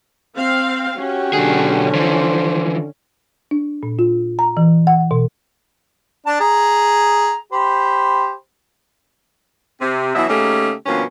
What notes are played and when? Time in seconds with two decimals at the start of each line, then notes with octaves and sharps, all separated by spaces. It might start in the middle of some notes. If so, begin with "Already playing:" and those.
0.36 C4 F5
0.98 C#4 F#4 G4
1.33 B1 D3 G#4
1.95 E3 F3 C5
3.51 D4
3.83 A#2
3.99 F4
4.39 A#5
4.57 E3
4.87 F#5
5.11 B2
6.26 D4 A5
6.40 G#4 A#5
7.52 G4 C5 B5
9.81 C3
10.15 B2 E3 F#3 E4 D#5 E5
10.29 C#3 A3 A#3 C#4 D#4 G4
10.86 G2 B2 F3 A#3 B3 C#4